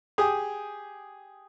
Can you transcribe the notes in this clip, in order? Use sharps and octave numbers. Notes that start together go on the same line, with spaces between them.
G4 G#4 G#5 D#6